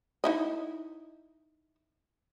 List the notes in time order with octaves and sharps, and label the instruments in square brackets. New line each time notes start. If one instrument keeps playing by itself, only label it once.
[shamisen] D#4 E4 D#5